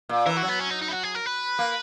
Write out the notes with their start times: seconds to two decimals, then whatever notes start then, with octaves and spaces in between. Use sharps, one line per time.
0.09 A#2
0.26 E3 A#4
0.37 F#4
0.43 F#3
0.48 B3
0.59 C#4
0.70 D#4
0.82 D#4
0.88 E4
0.93 F#4
1.03 G#4
1.15 A#4
1.26 B4
1.59 A#3